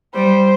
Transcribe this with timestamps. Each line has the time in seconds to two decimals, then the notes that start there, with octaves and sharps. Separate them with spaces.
0.14 G3 C5